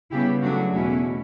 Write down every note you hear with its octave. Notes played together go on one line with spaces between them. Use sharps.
C#3 G3 B3 E4 G4
C#3 F#3 A3 D4 F#4
E2 B2 A3 C#4 E4